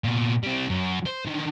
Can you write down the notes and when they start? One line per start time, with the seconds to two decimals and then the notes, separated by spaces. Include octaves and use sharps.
0.04 A#2 B3
0.43 G3 C4
0.69 F#2
1.06 C5
1.25 D3 D#3